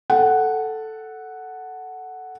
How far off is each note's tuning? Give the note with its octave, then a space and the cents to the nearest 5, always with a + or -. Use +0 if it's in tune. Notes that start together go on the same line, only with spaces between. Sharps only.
A4 +0 F#5 +0